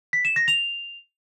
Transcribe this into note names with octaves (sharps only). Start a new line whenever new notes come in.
B6
E7
A#6
F7